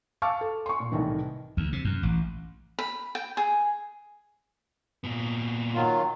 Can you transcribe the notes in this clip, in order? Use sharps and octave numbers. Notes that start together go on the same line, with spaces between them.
F5 A5 C#6 D6 E6 F6
A4
C6 C#6
A#2
C2 A2 D#3 E3
D2
C3
F#2
A1
B5
G5
G#4
A#2 B3
D#3 F#3 F4